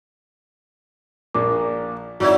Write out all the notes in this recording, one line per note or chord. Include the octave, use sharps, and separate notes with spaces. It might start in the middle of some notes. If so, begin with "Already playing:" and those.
A#1 A#2 A#3 D6
G#1 F#3 E4 F#4 C#5 D5 G#6